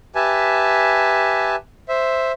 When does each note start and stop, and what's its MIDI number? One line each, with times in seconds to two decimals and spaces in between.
0.15 1.56 67
0.15 1.56 71
0.15 1.56 76
0.15 1.56 80
0.15 1.56 81
1.89 2.32 72
1.89 2.32 76